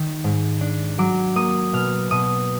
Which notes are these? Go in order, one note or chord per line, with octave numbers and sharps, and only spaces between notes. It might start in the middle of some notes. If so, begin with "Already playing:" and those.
Already playing: D#3
G#2
D4
F#3 D6
A#3 D#6
B2 F6
B2 D#6